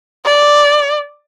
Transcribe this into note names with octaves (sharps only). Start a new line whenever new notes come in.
D5